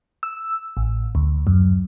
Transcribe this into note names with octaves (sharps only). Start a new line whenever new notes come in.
E6
A1
D2
F#2